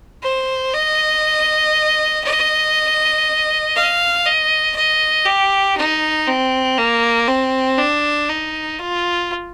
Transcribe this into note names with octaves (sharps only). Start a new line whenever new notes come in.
C5
D#5
D#5
F5
D#5
D#5
G4
D#4
C4
A#3
C4
D4
D#4
F4